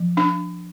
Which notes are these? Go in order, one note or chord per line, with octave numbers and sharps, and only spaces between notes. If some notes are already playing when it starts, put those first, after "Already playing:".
Already playing: F3
D4